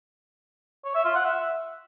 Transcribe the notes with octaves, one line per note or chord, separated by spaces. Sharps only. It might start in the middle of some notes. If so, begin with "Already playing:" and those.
C#5
E5
F4
F#5
E5